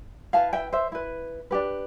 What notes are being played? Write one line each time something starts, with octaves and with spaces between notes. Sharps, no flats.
E4 B4 F5 A5
E5 G5
C5 E5
E4 B4
D4 G4 B4